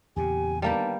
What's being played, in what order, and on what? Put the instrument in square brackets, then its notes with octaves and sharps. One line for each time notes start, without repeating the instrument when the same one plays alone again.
[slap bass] E2 A#2 C#3 [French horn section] G4 [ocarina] G#5
[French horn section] D3 D#3 B3 [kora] G3 A#3 G4 [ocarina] A5